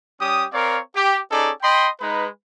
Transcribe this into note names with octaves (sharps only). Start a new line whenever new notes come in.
G3 C#4 G4 D#6
C4 A#4 C#5 D5 F5
G4
C#4 D#4 G#4 A4 D5
D#5 G5 B5 C6
G#3 D#4 B4